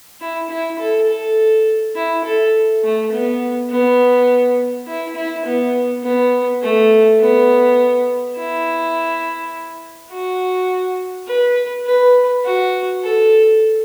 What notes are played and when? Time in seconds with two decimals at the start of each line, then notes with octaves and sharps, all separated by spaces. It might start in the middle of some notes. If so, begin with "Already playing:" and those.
0.21 E4
0.50 E4
0.79 A4
1.09 A4
1.95 E4
2.24 A4
2.83 A3
3.12 B3
3.70 B3
4.87 E4
5.16 E4
5.45 B3
6.03 B3
6.62 A3
7.20 B3
8.37 E4
10.11 F#4
11.28 B4
11.86 B4
12.44 F#4
13.03 A4